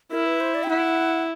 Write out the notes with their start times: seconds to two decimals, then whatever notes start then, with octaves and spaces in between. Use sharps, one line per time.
0.11 E4 A#4
0.26 B4
0.40 C5
0.54 D5
0.63 G5
0.69 E4 F#5